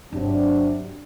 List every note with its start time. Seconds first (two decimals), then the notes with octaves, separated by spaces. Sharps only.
0.13 G1 C3 F#3 D4